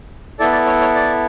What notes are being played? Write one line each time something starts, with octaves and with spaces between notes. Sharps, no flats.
B3 E4 A4 D5
D5
C#5
C#5
D5